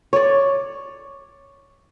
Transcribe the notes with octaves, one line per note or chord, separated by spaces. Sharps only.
C#5 D5